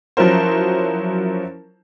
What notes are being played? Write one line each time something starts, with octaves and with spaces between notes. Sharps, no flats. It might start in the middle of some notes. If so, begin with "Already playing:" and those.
F3 F#3 C#4 E4 A#4 C5